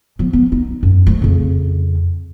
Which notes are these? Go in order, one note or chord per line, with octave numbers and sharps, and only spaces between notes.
F3 B3
B3
D#4
F#2
F3 A3
F2 C#3